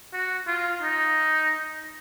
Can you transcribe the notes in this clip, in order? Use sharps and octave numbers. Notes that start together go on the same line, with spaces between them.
F#4
F4
D#4